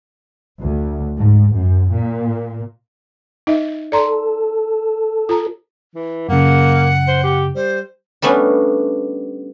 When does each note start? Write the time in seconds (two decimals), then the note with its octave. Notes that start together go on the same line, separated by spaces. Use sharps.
0.62 D2
1.16 G#2
1.54 F#2
1.92 A#2
3.47 D#4 D#5 E5
3.92 A4 D5 A#5 C6
5.29 F4 A#5
5.95 E3
6.29 F#2 C#3 A#3 F#5
7.08 C5
7.24 G4
7.55 G3 C5
8.22 G3 A3 B3 C#4 D4